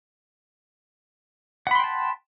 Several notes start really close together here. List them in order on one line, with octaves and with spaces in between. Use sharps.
F#5 B5 C6 G5 A5